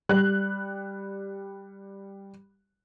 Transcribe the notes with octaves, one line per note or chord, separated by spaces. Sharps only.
G3 F#6